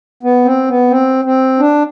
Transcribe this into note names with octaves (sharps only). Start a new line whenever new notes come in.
B3
C4
B3
C4
C4
D4